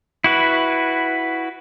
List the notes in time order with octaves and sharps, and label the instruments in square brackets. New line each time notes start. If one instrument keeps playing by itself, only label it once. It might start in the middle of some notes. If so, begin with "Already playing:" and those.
[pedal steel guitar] E4 F#4 B4